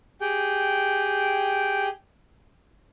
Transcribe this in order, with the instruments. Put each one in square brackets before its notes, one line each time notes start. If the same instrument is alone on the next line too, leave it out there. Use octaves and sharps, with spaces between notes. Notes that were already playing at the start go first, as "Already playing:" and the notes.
[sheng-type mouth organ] G4 G#4 G5